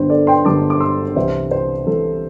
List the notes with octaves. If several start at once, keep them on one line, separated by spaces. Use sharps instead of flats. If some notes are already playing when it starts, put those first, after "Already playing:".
Already playing: G1 G2 D3 G3 C5
A4 D5
G5 C6
G1 G2 D3 G3 A5 D6
D6
C6 E6
C2 C3 E3 C5 E5
C5
C2 C3 E3 A4